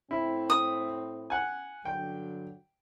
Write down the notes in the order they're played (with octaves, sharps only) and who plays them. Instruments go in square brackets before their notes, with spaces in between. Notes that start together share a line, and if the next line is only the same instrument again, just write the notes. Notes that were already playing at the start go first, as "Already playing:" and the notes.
[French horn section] A2 C4 [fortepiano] E4
[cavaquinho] D#6
[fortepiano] F#5 G#5
[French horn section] G2 D3 F#3 [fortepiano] G5